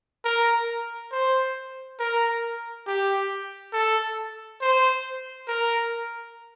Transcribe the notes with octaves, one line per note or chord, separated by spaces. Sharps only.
A#4
C5
A#4
G4
A4
C5
A#4